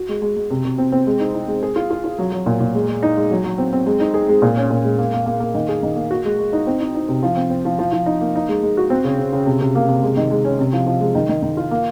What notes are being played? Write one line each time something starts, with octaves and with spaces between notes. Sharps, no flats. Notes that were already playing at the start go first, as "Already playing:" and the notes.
Already playing: F#4
G#3
G#3
G#3
C3
C3
C4
C4
G#3
D#4
D#4
G#3
G#4
F4
F4
F4
F#3
F#3
A#2
A#2
G#3
G#3
D#4
G#3
F#3
F#3
C4
C4
G#3
D#4
G#4
G#3
A#2
C#4
A#2
G#3
A#3
A#3
A#3
A#3
D#3
G#4
D#3
A#3
F#4
G#3
G#3
D#4
C4
D#4
D#4
C3
F3
C4
C4
F3
F3
F3
D#4
A#3
D#4
G#3
G#3
F#4
C4
C#3
C#3
C#3
C3
C3
A#3
C3
G#3
D#3
G#3
C#4
C3
F3
F3
G#3
D#3
D#3
D#3
F4
A#3